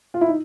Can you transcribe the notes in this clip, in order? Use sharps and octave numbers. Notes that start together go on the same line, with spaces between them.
F4
E4
D#4